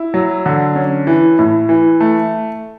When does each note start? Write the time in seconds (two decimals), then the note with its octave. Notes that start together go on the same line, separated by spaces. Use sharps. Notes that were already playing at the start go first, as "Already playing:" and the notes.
Already playing: E4
0.14 F#3
0.46 D3
0.76 C#4
1.07 E3
1.39 A2
1.69 E3
2.00 A3